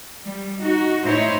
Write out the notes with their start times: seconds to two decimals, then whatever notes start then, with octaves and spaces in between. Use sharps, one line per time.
0.22 G3
0.61 D#4 F#4
1.04 A2 D#4 E4 C5 C#5